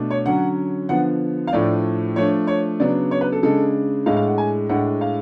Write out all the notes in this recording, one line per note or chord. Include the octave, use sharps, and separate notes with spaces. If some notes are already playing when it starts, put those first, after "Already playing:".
Already playing: B2 A3 D4
C#5
D3 F#3 C#4 F#5
D3 F3 B3 F#5
F5
A2 F3 A3 D4 D5
F3 A3 D4 C#5
C#5
C#3 F#3 B3 D4 D5
C#5
B4
A4
C#3 G#3 D4 A4
A2 G#3 D4 F5
F5
F#5
G#5
A2 G#3 D4 F#5
F5